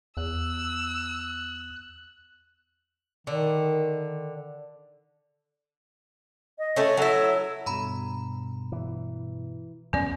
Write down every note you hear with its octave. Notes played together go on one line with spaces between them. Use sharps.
E2 E6 F#6
D3 D#3
D#5
A3 C#4
F#3 E4 A4
G2 B2 A#5 B5
E3
E2 G2 B3 C#4 D5